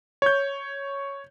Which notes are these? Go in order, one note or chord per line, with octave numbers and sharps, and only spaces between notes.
C#5 G6